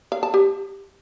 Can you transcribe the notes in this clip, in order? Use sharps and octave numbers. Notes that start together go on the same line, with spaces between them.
F5
A5
G4